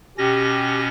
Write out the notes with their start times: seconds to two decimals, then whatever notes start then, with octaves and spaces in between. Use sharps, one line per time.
0.18 B2 C#4 G4 A#6